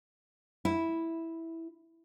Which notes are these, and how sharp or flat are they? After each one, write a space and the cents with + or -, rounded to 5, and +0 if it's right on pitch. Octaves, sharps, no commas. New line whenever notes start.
E4 -5